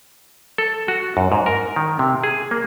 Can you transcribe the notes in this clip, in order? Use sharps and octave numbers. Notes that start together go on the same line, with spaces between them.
A4
F#4
F#2
G#2
A#4
D#3
C3
G#4
A#3